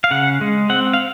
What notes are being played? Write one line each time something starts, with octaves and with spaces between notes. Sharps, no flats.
F5
C#3 F#5
G#3
C4 F#5
F5